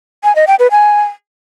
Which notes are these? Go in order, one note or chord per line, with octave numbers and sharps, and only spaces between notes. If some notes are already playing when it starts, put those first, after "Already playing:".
G#5
D#5
G5
B4
G#5